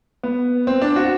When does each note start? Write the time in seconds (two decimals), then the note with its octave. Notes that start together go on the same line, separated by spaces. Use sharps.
0.23 B3
0.67 C4
0.82 D4
0.96 F#4